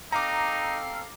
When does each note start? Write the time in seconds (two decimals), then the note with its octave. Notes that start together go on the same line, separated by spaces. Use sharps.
0.12 C4 D#4 A4 F5 A#5 D6